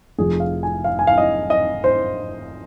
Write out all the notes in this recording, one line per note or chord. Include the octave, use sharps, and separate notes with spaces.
F1 F2 F3 G#4
F5
G#5
F5
G#5
F5
D#5
D#5
C5